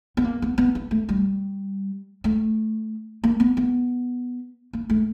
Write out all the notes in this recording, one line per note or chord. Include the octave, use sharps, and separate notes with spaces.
B3
A#3
B3
B3
B3
A3
G3
A3
A#3
B3
B3
A#3
A3